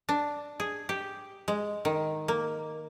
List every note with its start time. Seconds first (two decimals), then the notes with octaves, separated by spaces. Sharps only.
0.09 D4
0.60 G#4
0.89 G4
1.48 G#3
1.85 D#3
2.28 A#3